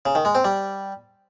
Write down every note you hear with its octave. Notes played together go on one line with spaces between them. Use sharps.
C#3
D#3
G#3
C4
G3